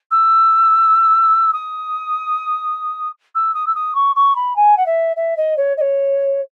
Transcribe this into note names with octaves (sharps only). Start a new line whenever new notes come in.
E6
D#6
E6
D#6
E6
D#6
C#6
C#6
B5
G#5
F#5
E5
E5
D#5
C#5
D#5
C#5